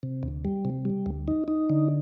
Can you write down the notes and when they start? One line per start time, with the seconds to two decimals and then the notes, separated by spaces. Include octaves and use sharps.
0.03 C3
0.23 D2
0.45 G3
0.65 C3
0.85 G3
1.06 D2
1.28 D#4
1.48 D#4
1.70 D3